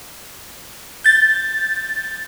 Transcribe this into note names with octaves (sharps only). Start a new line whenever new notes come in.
G6 A6